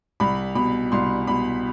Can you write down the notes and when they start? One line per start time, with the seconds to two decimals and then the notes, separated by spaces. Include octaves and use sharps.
0.20 C2 B5
0.55 B2 B5
0.92 C2 C6
1.27 B2 B5